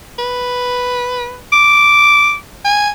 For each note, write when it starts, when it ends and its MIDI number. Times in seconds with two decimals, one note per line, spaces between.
0.19 1.37 71
1.52 2.35 86
2.65 2.90 80